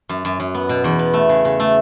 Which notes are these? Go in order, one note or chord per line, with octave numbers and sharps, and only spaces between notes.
F#2
F#2
F#2
B3
B2
E2
B3
A3
C#3
C#3
A3